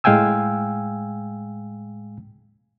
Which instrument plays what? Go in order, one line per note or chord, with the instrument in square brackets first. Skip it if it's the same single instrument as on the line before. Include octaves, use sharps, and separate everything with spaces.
[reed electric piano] A2 G#3 F5 G5 G#5 E6